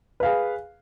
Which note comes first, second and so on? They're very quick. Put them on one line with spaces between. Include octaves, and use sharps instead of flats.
B4 F5 G#4